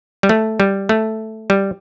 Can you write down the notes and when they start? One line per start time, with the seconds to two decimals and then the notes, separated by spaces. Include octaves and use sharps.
0.23 G3
0.29 A3
0.60 G3
0.89 A3
1.50 G3